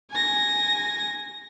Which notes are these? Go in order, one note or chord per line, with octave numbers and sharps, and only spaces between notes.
G#5 A#6